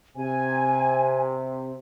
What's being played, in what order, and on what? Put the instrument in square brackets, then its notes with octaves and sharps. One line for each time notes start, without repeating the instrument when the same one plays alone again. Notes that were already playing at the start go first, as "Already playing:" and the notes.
[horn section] C3 [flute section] G#5